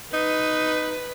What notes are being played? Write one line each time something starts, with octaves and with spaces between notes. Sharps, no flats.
D#4 B4